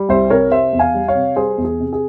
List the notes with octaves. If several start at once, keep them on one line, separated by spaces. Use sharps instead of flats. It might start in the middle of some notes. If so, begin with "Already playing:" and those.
Already playing: G3
C2 C5 E5
C3 A#4 C#5
C3 C5 E5
E2
F5 G#5
G3
C#5 F5
C3
G3 G#4 C5
E2
G#4
C3
G#4